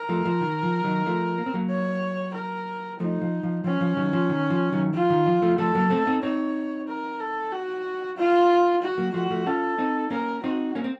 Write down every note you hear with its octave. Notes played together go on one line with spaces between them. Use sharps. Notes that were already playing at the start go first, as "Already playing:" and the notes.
Already playing: A#4
F3 A3
F3
D#3
F3
D#3 F#3
F3 A3
A#3
C4
F#3 A#3
C#5
A#4
F3 A3 D#4
F3
F3
F3 C#4
F3
D#3 F#3
F3
D#3
F3
D#3 F#3
F3 F4
D#3
F3
F3 A3
F3 A3 A4
F#3 A#3
A3 C4
C4 D#4
C4 D#4 C#5
A#4
A4
F#4
F4
F#4
F#3 A#3
F3 A3 F#4
F3 A3
C#4 F4 A4
C4 D#4
A#3 C#4 A#4
C4 D#4 F#4
A#3 C#4
C4